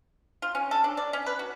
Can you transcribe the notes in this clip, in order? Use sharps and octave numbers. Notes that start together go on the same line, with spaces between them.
F4
C#4
A4
D4
D5
C#4
B4
F#4